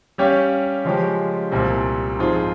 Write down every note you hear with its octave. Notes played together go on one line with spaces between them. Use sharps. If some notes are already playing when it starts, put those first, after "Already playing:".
G3 C#4 G4 C#5 F5
C#3 F3 G#3 C#4 G4
C2 A#2 G3 C4
G#2 F3 C4 F4 G#4